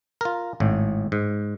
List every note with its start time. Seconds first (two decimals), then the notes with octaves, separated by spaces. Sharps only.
0.21 F4 A#4
0.60 G#1 A2
1.12 G#2